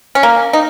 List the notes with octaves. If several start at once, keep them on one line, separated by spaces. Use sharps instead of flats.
C#4
A#3
D#4